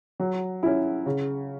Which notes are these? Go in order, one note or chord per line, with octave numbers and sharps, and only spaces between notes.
F#3
C#4 E4
C#3